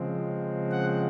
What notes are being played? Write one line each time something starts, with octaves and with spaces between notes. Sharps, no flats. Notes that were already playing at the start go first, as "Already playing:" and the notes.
Already playing: C#3 F3 G#3 C4
F#5